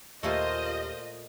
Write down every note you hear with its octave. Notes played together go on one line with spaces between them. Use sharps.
D#2 A#2 A3 F4 G4 C5 D#5 C6